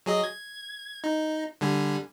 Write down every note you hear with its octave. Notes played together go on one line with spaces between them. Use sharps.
F#3 G#4 D#5
G#6
D#4
D3 G3 G#5